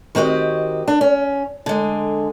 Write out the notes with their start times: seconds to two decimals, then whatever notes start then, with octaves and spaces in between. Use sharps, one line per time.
0.15 D#3 C4 F#4 G4 D#5
0.88 D4
1.01 C#4
1.66 D3 G#3